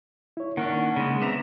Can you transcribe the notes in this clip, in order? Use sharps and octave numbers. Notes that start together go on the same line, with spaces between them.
E4 C#5
D#3 A#3 C#4 D4 F#5
C#3 G#3
B3 C4 D4 E5 A#5